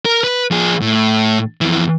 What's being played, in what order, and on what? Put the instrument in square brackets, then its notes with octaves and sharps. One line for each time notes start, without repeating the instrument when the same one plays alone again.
[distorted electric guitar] A#4
B4
F3 G#4
A2
F2 E3